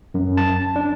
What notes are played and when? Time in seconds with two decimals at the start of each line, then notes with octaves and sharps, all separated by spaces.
0.14 F#2
0.37 A5
0.76 D4